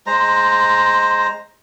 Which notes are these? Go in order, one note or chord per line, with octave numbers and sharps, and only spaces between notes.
G#3 C5 A#5